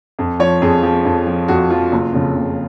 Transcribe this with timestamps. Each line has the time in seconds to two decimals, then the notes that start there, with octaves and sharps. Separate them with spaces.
0.19 F2
0.39 F3 C#5
0.62 F2 G#4
0.83 F3
1.05 F2
1.26 F3
1.48 F2 F#4
1.70 F3 F4
1.92 F#1
2.13 F2 C#3
2.35 F#1